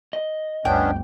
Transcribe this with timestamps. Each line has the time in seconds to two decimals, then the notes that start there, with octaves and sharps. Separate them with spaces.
0.13 D#5
0.65 G1 D2 B3 C#4 D4 G5